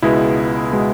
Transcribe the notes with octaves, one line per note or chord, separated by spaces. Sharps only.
C#2 B2 G#3 B3 E4
B2 G#3 B3